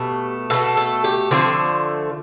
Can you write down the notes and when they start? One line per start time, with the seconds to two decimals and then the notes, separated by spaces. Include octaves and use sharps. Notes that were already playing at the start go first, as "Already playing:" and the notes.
Already playing: B2 A3 G4
0.50 B2 A3 A4
0.77 A4
1.04 G4
1.31 D3 F3 A3 C4